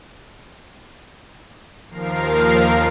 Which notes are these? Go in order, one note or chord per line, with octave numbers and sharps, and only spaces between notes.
D#2 F3 A#4 F5 C7